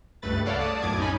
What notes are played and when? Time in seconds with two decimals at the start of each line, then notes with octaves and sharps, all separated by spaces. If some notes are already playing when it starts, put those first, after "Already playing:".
0.22 C#2 G2 A3 B4 A6
0.46 A3 A4 C#5 D5 F5 F#5
0.58 D5 A5 D#6
0.82 B1 F#2 A2 D6 G#6
0.99 C#4 D#4 G#5 B5